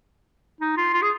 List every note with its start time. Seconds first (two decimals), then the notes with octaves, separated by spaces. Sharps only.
0.61 D#4
0.77 F4
0.93 F4
1.02 G#4